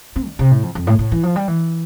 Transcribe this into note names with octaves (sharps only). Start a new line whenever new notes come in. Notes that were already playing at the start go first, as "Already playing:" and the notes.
C4
D3
C3
A2
F2
F2
A2
A2
E3
F3
G3
E3